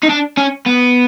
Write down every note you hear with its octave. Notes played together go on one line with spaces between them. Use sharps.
D#4
D4
C#4
B3